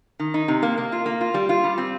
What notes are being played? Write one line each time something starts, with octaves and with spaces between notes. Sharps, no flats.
D#3
D#4
C3
A#3
A#3
F4
A#3
F4
G3
F4
G3
C4